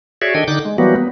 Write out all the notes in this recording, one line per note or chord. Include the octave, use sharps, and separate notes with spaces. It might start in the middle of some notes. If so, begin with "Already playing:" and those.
F#4 G#4 C#5 D5 E5
D#3 D4 A4 D#5 G5 G#6
D3 D#4 D6 F#6 G6 A6
G#3
E3 F#3 G3 A#3 B3 F#4
B3